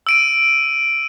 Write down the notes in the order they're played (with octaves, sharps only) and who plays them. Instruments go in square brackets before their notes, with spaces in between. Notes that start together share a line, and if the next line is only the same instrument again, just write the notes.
[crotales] E6 D7 D#7